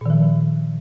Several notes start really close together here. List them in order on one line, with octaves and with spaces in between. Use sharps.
A#2 D#3 F3